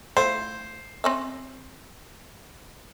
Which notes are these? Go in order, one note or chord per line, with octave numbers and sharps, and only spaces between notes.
A3 E4 F4 C5
C4 C#4 E5